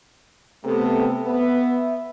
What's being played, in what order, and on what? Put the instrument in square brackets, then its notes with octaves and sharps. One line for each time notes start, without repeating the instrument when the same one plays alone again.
[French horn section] C3 A3 B3 [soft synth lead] A4
[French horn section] B3 [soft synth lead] E5